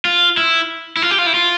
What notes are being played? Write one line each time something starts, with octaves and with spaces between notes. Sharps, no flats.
F4
E4
E4
F4
G4
F4
E4
F4